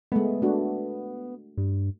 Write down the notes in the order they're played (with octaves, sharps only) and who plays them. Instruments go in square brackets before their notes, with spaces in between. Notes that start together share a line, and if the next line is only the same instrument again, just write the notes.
[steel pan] G#3 A3 [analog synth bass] B3
[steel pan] A3 D4 F#4
[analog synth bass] G2